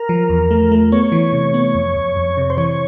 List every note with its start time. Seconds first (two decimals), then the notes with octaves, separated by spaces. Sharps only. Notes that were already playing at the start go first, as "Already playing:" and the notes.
Already playing: A#4
0.09 F3
0.29 E2
0.51 A3
0.72 A3
0.92 B3 C#5
1.12 E3
1.33 C3
1.54 B3
1.75 F2
1.96 F2
2.16 F2
2.37 C3
2.50 C5
2.57 E3 C#5